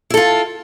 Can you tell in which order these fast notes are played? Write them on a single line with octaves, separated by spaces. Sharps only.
E4 A4 F4